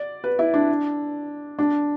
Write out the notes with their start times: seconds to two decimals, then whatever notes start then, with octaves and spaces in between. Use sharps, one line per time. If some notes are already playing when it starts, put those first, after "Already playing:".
Already playing: D5
0.24 B4
0.39 E4
0.54 D4
1.59 D4